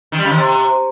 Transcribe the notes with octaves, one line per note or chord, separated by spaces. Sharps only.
D#3
G3
C#3
D#3
C3